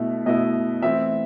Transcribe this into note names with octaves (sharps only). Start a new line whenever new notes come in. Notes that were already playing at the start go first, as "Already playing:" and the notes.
Already playing: B2 A3 E4
B2 A3 E4 D#5
E3 A3 C4 E4 E5